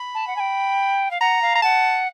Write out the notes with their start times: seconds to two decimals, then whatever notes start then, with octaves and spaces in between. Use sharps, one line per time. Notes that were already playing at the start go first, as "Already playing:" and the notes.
Already playing: B5
0.14 A5
0.27 F#5
0.36 G#5
0.40 G5
1.11 F5
1.21 F#5 A#5
1.42 F5
1.56 A#5
1.62 F#5 A5